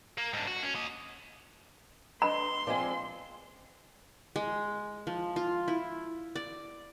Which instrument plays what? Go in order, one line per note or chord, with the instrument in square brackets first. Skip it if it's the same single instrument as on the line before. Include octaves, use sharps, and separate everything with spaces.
[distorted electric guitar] A#3
G#2 D4
F#4
C#4
A#3 D#5
[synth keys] D4 B4 D#5 [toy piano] B5 [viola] C6
[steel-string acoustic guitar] F3 G#3 C4 [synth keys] D5 D#5 G#5
[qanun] G#3
F3
F4
E4
D5